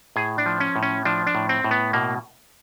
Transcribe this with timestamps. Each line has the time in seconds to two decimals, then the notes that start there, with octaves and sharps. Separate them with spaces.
0.16 A2 G#4
0.38 D4
0.46 F3
0.60 C#4
0.76 A2
0.83 C#4
1.05 F3 D4
1.27 D4
1.35 A2
1.49 C4
1.64 A2
1.71 B3
1.93 B2 A#3